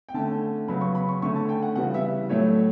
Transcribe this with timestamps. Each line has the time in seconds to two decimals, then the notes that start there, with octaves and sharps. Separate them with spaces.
0.09 G5
0.14 D3 A3 C#4 A5
0.68 C#3 F#3 B3 B5
0.81 C#6
0.95 B5
1.09 C#6
1.22 D3 A3 C#4 C#6
1.36 A5
1.49 G5
1.62 F#5
1.76 C#3 E3 G3 B3 F#5
1.94 E5
2.29 A2 F#3 A3 C#5